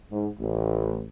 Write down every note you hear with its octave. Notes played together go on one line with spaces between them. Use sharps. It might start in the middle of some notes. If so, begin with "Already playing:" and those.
G#2
A1